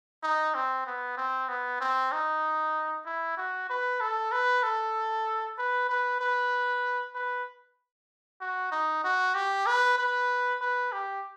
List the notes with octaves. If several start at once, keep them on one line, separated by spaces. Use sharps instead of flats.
D#4
C4
B3
C4
B3
C4
D#4
E4
F#4
B4
A4
B4
A4
B4
B4
B4
B4
F#4
D#4
F#4
G4
B4
B4
B4
G4